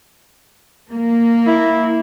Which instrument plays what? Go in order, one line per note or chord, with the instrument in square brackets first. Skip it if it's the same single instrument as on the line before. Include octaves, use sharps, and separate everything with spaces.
[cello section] A#3
[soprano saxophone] E4